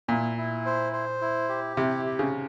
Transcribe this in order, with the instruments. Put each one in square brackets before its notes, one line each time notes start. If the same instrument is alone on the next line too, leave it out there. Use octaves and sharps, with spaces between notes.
[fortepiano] A#2 [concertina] E4
[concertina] E4
C5
C5
E4
G4
[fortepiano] C3 [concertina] E4
[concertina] G4
[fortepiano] C#3